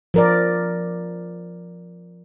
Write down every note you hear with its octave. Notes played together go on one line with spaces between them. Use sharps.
F3 A#4 D5